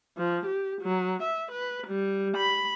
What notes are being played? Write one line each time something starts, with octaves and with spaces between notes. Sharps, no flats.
F3
G4
F#3
E5
B4
G3
B5